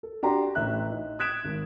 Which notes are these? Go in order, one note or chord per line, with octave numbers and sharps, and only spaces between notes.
A4
D4 F#4 G4 D5 A#5 C6
A1 A2 E5 F#6
D#4
D#6 F#6 G#6 B6 D7 E7
G#1